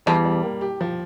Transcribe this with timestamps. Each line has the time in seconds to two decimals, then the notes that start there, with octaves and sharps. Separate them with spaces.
0.06 E2 G3
0.24 G3
0.43 A#3
0.61 G4
0.81 F3